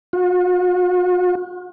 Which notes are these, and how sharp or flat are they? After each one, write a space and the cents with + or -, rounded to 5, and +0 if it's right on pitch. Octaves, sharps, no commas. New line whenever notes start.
F#4 -45